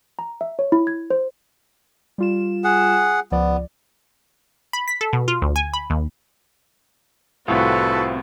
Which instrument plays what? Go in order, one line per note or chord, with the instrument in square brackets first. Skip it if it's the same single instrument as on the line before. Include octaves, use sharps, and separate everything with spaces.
[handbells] A#5
E5
C#5
E4
G#6
C5
[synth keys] G3 F4 E7
[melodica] G#4 F#5
[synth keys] C#2 F3 D5 [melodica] B3
[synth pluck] B5
B6
A4
B2
F4
D2
G#5
B5
D#2
[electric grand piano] C2 A2 [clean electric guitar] C3 C4 F4 [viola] F#4 B4 [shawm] A4